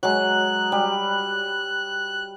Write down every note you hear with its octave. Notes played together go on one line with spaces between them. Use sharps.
F#3 G#3 F#6
G3